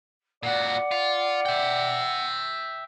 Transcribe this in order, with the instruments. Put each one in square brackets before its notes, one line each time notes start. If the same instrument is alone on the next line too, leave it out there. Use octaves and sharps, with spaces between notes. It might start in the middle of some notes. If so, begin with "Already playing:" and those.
[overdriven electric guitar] A#2 F#4 [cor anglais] D5 [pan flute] F#5
[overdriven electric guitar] F4
E5 G5